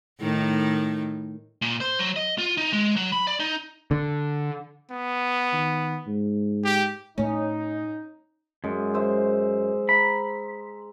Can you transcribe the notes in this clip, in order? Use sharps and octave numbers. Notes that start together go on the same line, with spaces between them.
A2 D#3 D#4
A#2
C5
F#3
D#5
F4
D#4
G#3
F#3
B5
D5
D#4
D3
B3
D#3
G#2
G4
A2 A3 C#4 D#4
F#2 G#3
C5 E5
A#5 B5